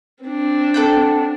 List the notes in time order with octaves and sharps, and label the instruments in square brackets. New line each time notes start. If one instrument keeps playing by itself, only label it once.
[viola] C4 D4
[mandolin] A4 F#5 G5